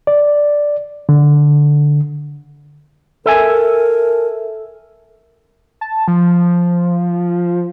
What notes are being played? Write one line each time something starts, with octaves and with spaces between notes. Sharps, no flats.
D5
D3
A4 A#4 E5 G#5
A5
F3